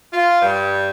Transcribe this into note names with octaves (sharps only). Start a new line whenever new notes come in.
F4
G2